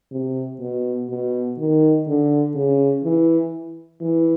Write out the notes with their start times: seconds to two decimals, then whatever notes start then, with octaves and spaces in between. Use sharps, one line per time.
0.12 C3
0.60 B2
1.09 B2
1.59 D#3
2.07 D3
2.55 C#3
3.04 E3
4.01 E3